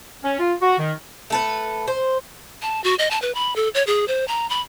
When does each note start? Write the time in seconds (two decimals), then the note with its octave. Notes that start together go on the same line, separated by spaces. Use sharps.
0.24 C#4
0.40 F4
0.62 F#4
0.79 D#3
1.30 A3 A4 B4
1.88 C5
2.62 A5
2.84 F#4
2.99 D#5
3.11 A5
3.22 B4
3.35 B5
3.56 A4
3.75 C#5
3.87 G#4
4.08 C5
4.28 A#5
4.50 B5